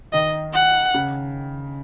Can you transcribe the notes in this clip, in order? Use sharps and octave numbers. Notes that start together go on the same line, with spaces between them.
D#3 D#5
F#5
C#3